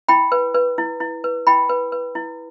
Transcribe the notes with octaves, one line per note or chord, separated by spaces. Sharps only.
E4 G5 B5
B4
B4
E4
E4
B4
E4 G5 B5
B4
B4
E4